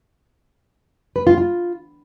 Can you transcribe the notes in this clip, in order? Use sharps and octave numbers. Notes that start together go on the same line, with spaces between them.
B4
F4
F4